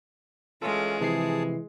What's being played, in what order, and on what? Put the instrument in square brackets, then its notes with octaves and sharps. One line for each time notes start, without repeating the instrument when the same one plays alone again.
[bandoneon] E3 C#4 F4 [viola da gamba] G#3 [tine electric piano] A4
[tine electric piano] C3 F3 C7 [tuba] E3 [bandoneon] G#4 A5